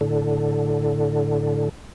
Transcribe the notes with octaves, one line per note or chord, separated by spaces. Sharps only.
A2 D3